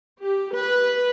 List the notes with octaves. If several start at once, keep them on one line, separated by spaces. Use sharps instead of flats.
G4
B4